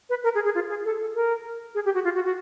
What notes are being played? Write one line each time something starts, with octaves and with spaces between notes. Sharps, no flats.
B4
A#4
G#4
G#4
F4
G#4
A4
A4
A#4
G#4
G4
F#4
F4
F#4
F#4